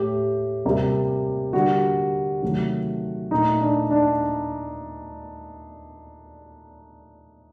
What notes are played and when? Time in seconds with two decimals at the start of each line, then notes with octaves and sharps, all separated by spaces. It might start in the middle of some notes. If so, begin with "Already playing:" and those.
Already playing: A2 A3 G4
0.65 C3 G3 A#3
1.53 D3 G3 A#3 F#4
2.43 C3 D#3 F#3 A3
3.31 A#2 A3 D#4
3.61 D4
3.91 D4